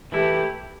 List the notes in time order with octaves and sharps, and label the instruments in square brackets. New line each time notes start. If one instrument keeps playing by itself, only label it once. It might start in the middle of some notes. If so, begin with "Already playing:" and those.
[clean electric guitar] E3 A3 E4 [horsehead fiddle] G4